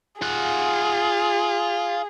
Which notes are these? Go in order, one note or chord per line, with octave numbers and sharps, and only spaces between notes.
F4 G#4 F#5